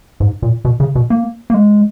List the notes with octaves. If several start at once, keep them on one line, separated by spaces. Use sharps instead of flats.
G#2
A#2
B2
C#3
B2
A#3
A#3
G#3